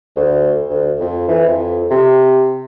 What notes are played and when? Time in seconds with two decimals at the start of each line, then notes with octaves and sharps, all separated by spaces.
0.16 D2
0.70 D2
1.00 F2
1.28 E3
1.48 F2
1.90 C3